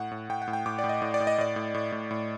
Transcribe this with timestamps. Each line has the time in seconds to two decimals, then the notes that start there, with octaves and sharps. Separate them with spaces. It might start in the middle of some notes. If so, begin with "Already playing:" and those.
Already playing: A2 F#5
0.11 A2
0.29 A2 G5
0.42 F#5
0.48 A2
0.53 G5
0.66 A2 D6
0.79 D5
0.84 A2
0.89 D#5
1.02 A2
1.14 D5
1.20 A2
1.27 D#5
1.38 A2 D5
1.56 A2
1.74 A2
1.92 A2
2.11 A2